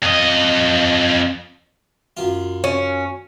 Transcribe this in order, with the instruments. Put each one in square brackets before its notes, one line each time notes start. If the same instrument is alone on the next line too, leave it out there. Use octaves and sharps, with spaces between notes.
[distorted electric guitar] F2 D#5
[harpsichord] F#2 F4
[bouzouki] C#4